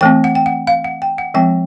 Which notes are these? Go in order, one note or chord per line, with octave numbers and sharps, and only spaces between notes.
E3 A3 C4 G5
F#5
G5
F#5
F5
F#5
G5
F#5
F3 G#3 C4 G5